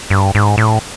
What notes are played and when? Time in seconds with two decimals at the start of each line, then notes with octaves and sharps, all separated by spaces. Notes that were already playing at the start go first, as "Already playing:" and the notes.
0.10 G2
0.35 G#2
0.58 A2